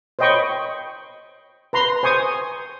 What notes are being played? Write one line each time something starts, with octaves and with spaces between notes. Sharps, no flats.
C5 C#5 D#5 G5 B5 C#6
B4 A#5 C6
C5 G#5 C#6 D#6